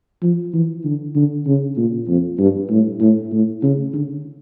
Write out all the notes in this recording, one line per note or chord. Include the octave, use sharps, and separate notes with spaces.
F3
E3
D3
D3
C#3
A#2
F2
G2
A2
A2
A2
C#3
D3